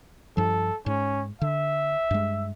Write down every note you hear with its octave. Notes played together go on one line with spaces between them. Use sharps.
G2 F3 A4
G#2 C#4
D3 E5
G2 G#3